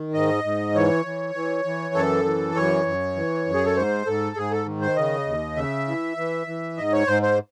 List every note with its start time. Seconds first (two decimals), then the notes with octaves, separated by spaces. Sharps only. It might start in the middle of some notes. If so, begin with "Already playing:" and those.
Already playing: D#3
0.14 G#2 D#5
0.44 G#2
0.75 E3 C#5
1.05 E3
1.35 E3
1.65 E3
1.95 F#2 A4
2.25 E3
2.56 F#2 C#5
2.86 F#2
3.16 E3
3.46 F#2
3.54 G#4
3.66 A4
3.77 G#2 C5
4.07 G#2 A4
4.36 G#2 G#4
4.51 A4
4.66 D#3
4.81 C5
4.97 C#3 D#5
5.26 D#2
5.56 C#3 E5
5.88 E3
6.17 E3
6.47 E3
6.77 G#2 D#5
6.93 C#5
7.07 G#2 C5
7.23 C5